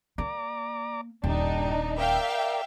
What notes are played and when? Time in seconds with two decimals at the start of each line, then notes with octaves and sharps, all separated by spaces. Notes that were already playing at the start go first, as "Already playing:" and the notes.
0.18 A#3 D5 A#5 D6
1.24 D#1 G2 D4 D#4 G5
1.98 A#4 D5 E5 F5 G5